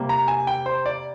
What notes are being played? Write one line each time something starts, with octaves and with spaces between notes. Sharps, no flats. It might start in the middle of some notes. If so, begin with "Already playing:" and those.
Already playing: C3 G3 A#3
A#5
G#5
G5
C5
D5